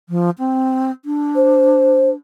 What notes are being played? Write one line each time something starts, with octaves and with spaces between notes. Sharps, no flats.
F3
C4
D4
C5